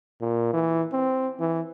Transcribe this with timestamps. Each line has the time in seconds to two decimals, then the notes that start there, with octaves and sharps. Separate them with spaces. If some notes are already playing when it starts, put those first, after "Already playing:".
0.21 A#2
0.53 E3
0.93 C4
1.40 E3